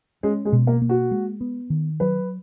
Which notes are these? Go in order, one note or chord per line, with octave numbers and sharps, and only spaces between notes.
G#3 C#4
G#3
B2
A#3
A#3
F#4
G#3
B3
D#3
F#3 B4